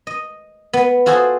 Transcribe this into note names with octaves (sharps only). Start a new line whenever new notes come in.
D#5
B3
F4 F#4 G#4 A4 C5